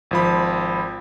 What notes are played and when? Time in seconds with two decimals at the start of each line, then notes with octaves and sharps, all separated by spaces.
0.11 G#1 F3 B5